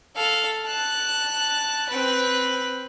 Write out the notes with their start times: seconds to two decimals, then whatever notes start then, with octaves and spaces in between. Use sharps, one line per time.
0.16 A4 F5
0.66 A5 F#6
1.89 C4 B4